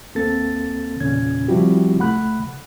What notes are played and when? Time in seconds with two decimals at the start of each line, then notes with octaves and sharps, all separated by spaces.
0.15 D#2 A#3 C4 A4 A6
1.00 E2 A#2 C#3 C#4 G#6
1.48 F3 G3 C4 E4 F#4 G4
1.98 C#2 A3 F#5 B5 F#6